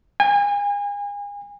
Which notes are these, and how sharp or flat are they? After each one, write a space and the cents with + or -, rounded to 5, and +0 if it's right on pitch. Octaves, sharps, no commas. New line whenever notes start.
G#5 -35